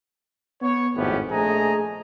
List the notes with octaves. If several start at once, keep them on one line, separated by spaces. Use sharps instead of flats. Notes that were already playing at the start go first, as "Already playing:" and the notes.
B3 C#5
G#1 F2 A2 B3 C#4 G4
A#1 A3 G#4 D#5 G#5 A#5